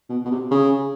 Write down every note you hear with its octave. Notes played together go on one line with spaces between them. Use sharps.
B2
B2
C3
C#3